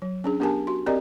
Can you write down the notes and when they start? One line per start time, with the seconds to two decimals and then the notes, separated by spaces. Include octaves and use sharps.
0.02 F#3
0.24 C#4 D4 G#4
0.40 B3 D4 G4 A#4 G#5 A5
0.67 F#4 C6
0.86 C4 G4 A#4 D5 D#5 A#5